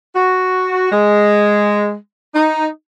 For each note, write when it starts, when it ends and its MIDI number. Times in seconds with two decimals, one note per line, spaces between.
0.15 0.89 66
0.91 1.94 56
2.35 2.65 63